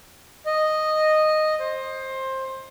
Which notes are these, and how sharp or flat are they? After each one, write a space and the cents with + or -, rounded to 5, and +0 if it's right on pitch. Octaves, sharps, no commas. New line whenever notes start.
D#5 -5
C5 +20